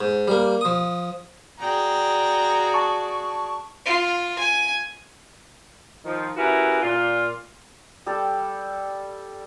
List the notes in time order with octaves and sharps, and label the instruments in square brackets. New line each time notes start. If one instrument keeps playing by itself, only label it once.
[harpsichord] G#2
G3 A#3
F3 D#6
[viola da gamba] F#4 G#4 D5 [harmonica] G5 A#5
[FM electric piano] A5 C#6
[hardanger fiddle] F4
G#5
[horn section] D#3 F3
C#4 E4 F#4 G4 A#4 B4
A#2 F4
[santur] G3 A4